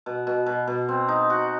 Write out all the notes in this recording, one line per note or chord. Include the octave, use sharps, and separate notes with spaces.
B2
B2
B2
B2
C4
D#4
F#4